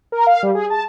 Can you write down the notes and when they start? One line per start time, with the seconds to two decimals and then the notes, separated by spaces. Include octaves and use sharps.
0.12 A#4
0.27 F5
0.43 G3
0.55 G#4
0.70 A5